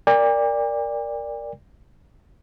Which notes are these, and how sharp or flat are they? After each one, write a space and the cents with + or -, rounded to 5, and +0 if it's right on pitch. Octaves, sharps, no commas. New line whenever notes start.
A#4 +0 D5 +0 G5 +45